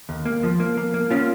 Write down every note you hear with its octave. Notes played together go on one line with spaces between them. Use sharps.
D#2
A#3
F3
A#3
A#3
A#3
A#3 C#4 F4